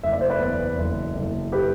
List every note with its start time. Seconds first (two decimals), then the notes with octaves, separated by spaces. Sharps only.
0.03 F#1 E5
0.13 D5
0.21 C5
0.30 B4 D5
0.40 E2
0.77 F#1
1.16 F#1
1.52 G4 B4